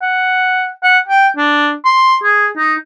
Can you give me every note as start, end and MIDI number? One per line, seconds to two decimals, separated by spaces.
0.02 0.71 78
0.83 0.99 78
1.08 1.28 79
1.37 1.73 62
1.85 2.17 84
2.23 2.48 68
2.57 2.74 63